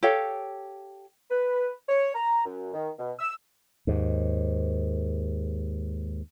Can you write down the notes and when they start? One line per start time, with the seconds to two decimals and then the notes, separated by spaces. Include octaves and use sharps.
0.03 G4 A4 C#5 F5
1.31 B4
1.89 C#5
2.15 A#5
2.45 F#2
2.74 D#3
2.99 B2
3.19 E6
3.87 D#2 G#2